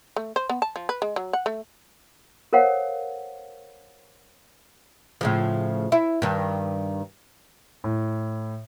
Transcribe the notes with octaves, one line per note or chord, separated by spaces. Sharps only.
A3
C5
B3
A5
F3
B4
G#3
F#3
F#5
A3
A4 A#4 C5 C#5 F5 F#5
A2 C#3 F3
E4
G2 D#3
A2